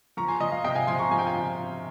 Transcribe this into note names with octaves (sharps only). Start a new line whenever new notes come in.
F3 A#5 C#6
G#5 C6
F3 D#5
F5
C3 D#5 G5
F5 G#5
F3 G#5 C6
A#5 C#6
F3 G#5
G5
F5 G#5
F3